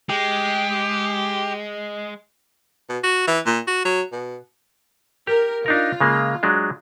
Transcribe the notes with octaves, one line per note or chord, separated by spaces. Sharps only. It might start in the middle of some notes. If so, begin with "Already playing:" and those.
G#3 G4
B2
F#4
E3
A#2
F#4
F#3
B2
G4 A#4
D4 D#4 F4 A#4
C#3 G#3 A#3
F#3 G#3 D4